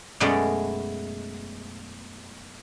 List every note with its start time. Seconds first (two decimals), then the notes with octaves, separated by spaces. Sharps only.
0.20 F#2 B2 G#3 A3 B3 D5